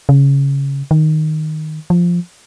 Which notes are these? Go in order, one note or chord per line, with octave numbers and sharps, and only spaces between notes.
C#3
D#3
F3